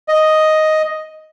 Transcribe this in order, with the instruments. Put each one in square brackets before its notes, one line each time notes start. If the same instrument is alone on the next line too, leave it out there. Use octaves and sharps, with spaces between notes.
[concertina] D#5